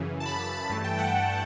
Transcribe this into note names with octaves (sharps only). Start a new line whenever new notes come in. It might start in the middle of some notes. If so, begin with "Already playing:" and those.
Already playing: F#2 C#3 E3
A5
F#2 C#3 E3 B5
A5
B5
G2 E3 A3 A5
G5
F#5
G2 E3 A3